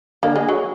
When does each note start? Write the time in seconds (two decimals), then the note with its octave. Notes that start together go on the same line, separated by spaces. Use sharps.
0.23 D3 A#3
0.36 G#3
0.48 F#3